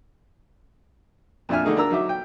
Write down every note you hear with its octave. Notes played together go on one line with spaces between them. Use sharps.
F2 A#2 D4 E5 G#5 F6
D3 A3 D#4 G#4
D4 A#4 A#5 E6
F#3 D#4 E5 D6
G5